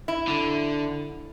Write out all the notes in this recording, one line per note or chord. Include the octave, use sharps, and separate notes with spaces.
E4
D3